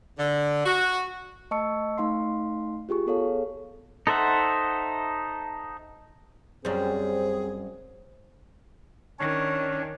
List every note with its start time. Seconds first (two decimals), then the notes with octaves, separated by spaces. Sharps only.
0.18 D3
0.65 F#4
1.51 A3 D#5 A5 C#6 E6 C#7
1.97 A3 D#4 F5 C6 C7
2.89 F4 G4 G#4 C#6
3.06 B3 G#4 A4 C#5 F5
4.07 D#4 A4 C5 E5 F#5
6.65 F#2 G3 C4 G#4 C5 C#5
9.19 D#3 C#4 D4 C#5